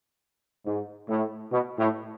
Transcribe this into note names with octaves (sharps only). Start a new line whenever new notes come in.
G#2
A2
B2
A2